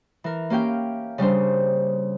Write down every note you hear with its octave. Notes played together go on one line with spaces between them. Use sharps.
E3 A#4
A#3 C#4 G4 F5 G5
C#3 G3 D4 C5